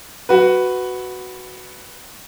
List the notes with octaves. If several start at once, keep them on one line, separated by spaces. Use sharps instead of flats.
F#4 B4